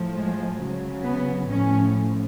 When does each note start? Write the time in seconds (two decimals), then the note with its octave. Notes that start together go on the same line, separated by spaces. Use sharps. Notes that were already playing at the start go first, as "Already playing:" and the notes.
Already playing: A2 F3
0.13 G#3
0.58 C#3 F#3
1.04 B3
1.49 A2 F3 C#4